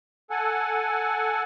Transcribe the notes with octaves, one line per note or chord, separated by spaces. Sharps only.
A4 F#5 G#5